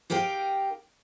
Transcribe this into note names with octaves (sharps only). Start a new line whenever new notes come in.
D#4 G4 A#4 F5 G5